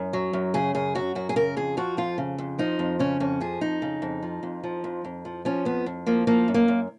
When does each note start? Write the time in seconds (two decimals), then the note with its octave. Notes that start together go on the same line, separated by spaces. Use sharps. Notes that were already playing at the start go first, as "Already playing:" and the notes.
Already playing: F#2
0.13 F#3
0.33 F#2
0.54 C#3 G#4
0.75 F#2 G#4
0.95 F#3 F#4
1.15 F#2 F#4
1.29 G#4
1.36 C#3 A#4
1.56 F2 G#4
1.77 F3 F#4
1.97 F2 F4
2.18 C#3
2.38 F2
2.59 F3 D#4
2.79 F2
2.99 C#3 C#4
3.20 F2 C#4
3.41 F3 G#4
3.61 F2 D#4
3.82 C#3
4.02 F2
4.23 F3
4.43 F2
4.64 F3
4.84 F2
5.05 F2
5.25 F3
5.45 F3 C#4
5.65 F2 B3
5.86 F2
6.06 F3 A#3
6.27 F3 A#3
6.48 F#2
6.54 A#3
6.68 F#2